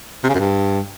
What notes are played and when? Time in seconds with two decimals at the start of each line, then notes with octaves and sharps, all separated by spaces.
0.24 C3
0.29 C#3
0.34 F#2
0.40 G2